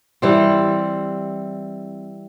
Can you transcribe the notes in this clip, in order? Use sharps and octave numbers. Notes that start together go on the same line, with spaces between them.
E3 G3 C4